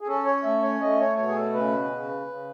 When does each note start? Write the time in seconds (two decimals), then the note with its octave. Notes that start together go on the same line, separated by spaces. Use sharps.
0.01 G#4
0.07 C#4 A4
0.25 C#5
0.44 A3 E5
0.62 C#5
0.81 A3 D#5
0.99 C#5
1.17 B2 C#5
1.29 G#4
1.35 A4
1.54 C#3 B4
1.90 C#3
2.27 C#3